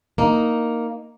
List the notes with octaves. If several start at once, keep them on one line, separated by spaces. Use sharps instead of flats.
A#3 D#4